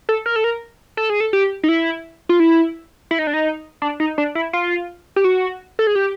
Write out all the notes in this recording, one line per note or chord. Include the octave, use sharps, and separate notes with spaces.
A4
A#4
A4
A#4
A4
G#4
A4
G4
D#4
E4
F4
E4
E4
D#4
D4
D#4
D4
D#4
D4
E4
F4
G4
F#4
A4
G#4
G4